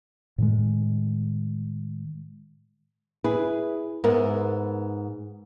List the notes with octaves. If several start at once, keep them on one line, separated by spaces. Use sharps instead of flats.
A2 D#3 G#3
E4 G#4 B4
G#2 B3 A#4 E5